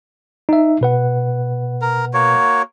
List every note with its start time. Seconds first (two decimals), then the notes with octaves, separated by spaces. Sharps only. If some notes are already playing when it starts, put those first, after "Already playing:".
0.49 D#4 E5
0.81 B2 B4 F#5
1.82 A#4
2.14 A#3 F#4 C#5